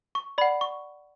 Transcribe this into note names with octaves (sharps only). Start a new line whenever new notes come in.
C#6
D5 F#5 B5
C#6